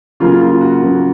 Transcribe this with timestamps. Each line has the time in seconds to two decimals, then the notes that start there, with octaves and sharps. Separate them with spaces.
0.20 C#3 F#3 A#3 F4
0.41 F4
0.61 F#4
0.81 C#3 F#3 A#3 G#4